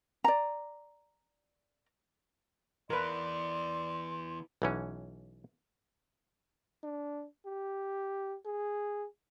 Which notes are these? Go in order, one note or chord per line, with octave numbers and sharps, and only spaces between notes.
D5 A#5
E3 B3 A#4 B4 D5 C6
B1 E3 C#4
D4
G4
G#4